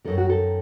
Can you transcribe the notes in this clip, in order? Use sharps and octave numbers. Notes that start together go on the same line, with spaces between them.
F#2 D#3 A4
F#4
A4